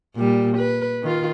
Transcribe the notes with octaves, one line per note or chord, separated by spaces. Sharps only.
A#2 G3
B4
D#3 F4